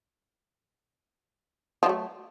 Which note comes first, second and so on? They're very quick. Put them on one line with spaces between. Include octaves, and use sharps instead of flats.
F3 F#3 A3